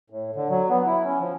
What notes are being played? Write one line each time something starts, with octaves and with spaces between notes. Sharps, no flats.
A2
D3
F#3
B3
E4
C#4
F3